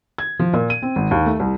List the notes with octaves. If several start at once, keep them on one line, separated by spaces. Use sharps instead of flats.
G#6
F3
A#2
D#7
C4
G#1
D#2
A3
C2